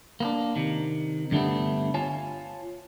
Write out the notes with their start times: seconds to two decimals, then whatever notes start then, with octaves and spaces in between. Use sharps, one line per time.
0.20 A#3 B3 D4
0.56 C3 D#3
1.31 G2 D3 G3 A3 B3
1.94 F4 C#5 G#5 A5